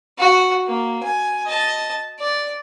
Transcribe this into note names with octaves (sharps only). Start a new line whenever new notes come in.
F#4
A#3
G#5
D#5 A5
D5